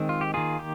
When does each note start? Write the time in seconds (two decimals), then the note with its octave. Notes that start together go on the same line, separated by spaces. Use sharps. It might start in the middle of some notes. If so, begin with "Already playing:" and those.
Already playing: D#3 G#3 C4
0.09 F4
0.21 G4
0.34 D#3 A#3 F4 G#4
0.59 G4